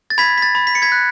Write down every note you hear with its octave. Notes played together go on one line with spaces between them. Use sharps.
A6
B5 G#6 B6
B6
A6
B5
B6
C#7
G#6 B6
F#6